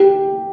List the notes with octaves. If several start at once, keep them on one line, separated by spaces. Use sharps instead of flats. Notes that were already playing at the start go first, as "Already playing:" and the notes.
Already playing: G4